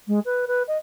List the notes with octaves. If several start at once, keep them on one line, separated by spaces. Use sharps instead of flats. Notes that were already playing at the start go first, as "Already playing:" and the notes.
G#3
B4
B4
D#5